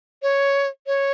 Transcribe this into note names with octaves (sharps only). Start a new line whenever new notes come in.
C#5
C#5